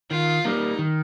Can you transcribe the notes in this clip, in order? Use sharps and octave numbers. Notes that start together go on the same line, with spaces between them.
D#3 F4
G3 A#3 D#4
D#3